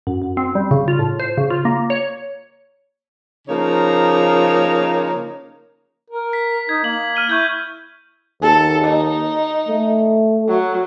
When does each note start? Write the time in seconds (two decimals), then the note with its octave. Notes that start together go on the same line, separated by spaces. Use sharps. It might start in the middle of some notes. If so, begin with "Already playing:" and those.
0.07 F#2
0.22 F#2
0.37 C4
0.55 G3
0.71 C#3
0.88 F4
0.99 A2
1.20 C5
1.38 C#3
1.50 F4
1.65 A#3
1.90 C#5
3.48 C#3 F3 A#3 D#4 C#5
6.10 A#4
6.33 B6
6.69 D#4 G#6
6.84 A#3 F#7
7.16 F6 D#7 G7
7.29 E4 C#6 G6 G#6
8.42 D#2 A4
8.84 D#4
9.68 A3
10.48 F#3